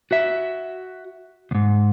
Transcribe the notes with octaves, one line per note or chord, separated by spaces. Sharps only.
F#4 E5
D2 G#2